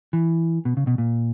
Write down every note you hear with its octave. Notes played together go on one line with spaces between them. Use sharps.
E3
B2
C#3
B2
A#2